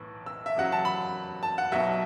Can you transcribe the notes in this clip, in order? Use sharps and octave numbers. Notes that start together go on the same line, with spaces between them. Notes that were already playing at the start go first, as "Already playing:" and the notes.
Already playing: B1 A2 E3
E6
E5
E2 C#3 F#3 F#5
A5
B5
A5
F#5
B1 B2 F#3 E5